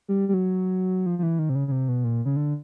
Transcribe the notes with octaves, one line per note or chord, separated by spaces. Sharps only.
G3
G3
F#3
F3
F3
E3
D#3
C3
C#3
C#3
C3
B2
A#2
C#3
D3